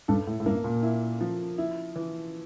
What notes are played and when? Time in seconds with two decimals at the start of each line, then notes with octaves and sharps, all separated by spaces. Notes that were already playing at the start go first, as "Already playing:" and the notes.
0.08 G2 A4
0.27 A2
0.40 A2
0.46 G2 A#3
0.64 A#2
0.83 E4
1.21 F3
1.58 E4
1.96 E3